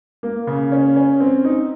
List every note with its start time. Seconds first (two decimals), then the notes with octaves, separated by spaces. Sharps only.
0.23 A#3
0.47 C#3
0.72 C#4
0.96 C#4
1.20 C4
1.45 D#4